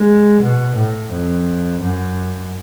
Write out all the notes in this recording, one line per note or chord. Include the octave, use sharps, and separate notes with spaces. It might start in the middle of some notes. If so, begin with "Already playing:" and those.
Already playing: G#3
B2
A2
F2
F#2